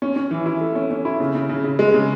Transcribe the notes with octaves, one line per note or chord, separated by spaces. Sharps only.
C#4
C#4
E3
E4
A3
C#4
C#4
E4
C#3
C#3
C#3
C#3
G#3
C#3